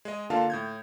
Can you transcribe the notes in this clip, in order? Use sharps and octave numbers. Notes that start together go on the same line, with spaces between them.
G#3 D#5
D3 A#3 F4 F5 A5
A2 G6 G#6